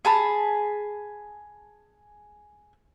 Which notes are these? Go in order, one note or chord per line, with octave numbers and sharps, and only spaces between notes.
G#4 A5 B5